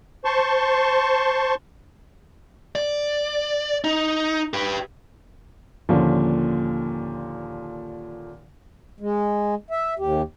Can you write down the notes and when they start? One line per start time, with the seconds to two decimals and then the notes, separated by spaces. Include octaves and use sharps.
0.25 C5 A5 C6 C#6
2.75 D5
3.84 D#4
4.54 G4 B4
5.89 D#2 A#2 D3 F3 C#4
9.00 G#3
9.71 E5
9.99 D#2 G4